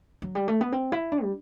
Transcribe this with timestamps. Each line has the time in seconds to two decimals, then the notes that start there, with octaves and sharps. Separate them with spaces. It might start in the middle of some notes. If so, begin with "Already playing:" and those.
0.22 F#3
0.35 G3
0.48 A3
0.61 B3
0.72 C4
0.92 E4
1.12 D4
1.23 G3